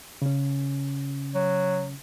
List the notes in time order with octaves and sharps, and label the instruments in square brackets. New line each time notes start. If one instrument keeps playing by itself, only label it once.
[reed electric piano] C#3 C#4
[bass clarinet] F#3